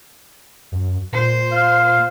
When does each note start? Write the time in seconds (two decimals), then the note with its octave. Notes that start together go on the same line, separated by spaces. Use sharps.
0.72 F#2
1.12 A#2 C5
1.52 F4